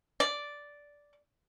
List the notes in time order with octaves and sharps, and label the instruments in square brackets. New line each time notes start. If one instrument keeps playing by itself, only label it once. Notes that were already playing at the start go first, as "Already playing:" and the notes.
[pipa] D5